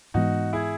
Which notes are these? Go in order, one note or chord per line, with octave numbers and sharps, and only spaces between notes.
G#2 E3 G#3 B3 D#4 F#4
E4 G#4